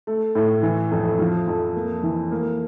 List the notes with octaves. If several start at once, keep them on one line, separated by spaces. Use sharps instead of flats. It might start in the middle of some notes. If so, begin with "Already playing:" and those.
A3
A2
E3
F2
F3
F2
A#3
E3
A#3